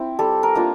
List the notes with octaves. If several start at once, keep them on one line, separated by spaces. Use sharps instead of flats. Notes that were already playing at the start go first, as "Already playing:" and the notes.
Already playing: C4 E4
G3 A4
A#4
A#3 D4 F4